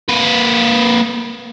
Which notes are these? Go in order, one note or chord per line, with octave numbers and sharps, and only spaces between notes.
A#3 B4